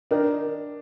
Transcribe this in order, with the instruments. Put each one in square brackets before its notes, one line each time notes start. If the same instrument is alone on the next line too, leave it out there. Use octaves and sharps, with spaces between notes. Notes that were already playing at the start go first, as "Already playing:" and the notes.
[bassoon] D#3 [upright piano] D4